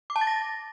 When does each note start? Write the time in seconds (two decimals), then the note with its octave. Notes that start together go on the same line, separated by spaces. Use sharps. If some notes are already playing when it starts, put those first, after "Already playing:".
0.10 D6
0.16 A5
0.21 A6
0.27 A#6